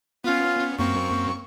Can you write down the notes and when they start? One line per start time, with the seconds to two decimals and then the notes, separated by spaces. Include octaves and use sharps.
0.24 B3 C#4 F4
0.79 F#2 A#3 C4 C#6